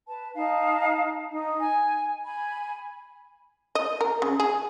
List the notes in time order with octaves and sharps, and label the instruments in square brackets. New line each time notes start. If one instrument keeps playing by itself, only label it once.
[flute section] B4 A5
D#4 F5 A5
D#4
G#5
G#5 B5
[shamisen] D#5
A#4
C#3
G#4